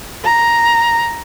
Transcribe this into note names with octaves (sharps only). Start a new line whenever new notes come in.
A#5